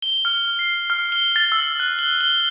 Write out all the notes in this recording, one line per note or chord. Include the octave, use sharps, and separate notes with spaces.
G7
F6
C7
F6
G7
A6
E6
F#6
G7
G7